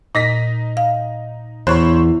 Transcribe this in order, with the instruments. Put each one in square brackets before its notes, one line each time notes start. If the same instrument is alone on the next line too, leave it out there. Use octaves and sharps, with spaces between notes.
[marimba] A#2 [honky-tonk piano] D#4 A#6 B6
[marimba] F5
[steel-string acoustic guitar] E2 [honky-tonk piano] C5 C#5 B5 [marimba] F#6